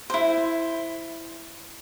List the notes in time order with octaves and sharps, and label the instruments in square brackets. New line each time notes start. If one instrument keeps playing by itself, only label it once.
[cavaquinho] E4 C5